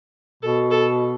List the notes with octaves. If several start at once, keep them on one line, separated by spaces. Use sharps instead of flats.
B2 A4
A4